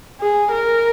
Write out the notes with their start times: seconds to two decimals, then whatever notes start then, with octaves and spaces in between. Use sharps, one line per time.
0.20 G#4
0.52 A#4